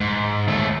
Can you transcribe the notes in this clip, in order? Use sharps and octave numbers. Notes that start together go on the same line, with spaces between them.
G#2
D#2 A3